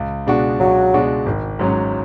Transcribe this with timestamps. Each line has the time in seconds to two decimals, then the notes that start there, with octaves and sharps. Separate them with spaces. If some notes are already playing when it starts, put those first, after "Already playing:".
Already playing: C#2
0.27 B2 G#3 D4 F#4
0.60 C#2 F#3
0.94 B2 G#3 D4 F#4
1.26 G#1
1.59 G#2 F#3 C#4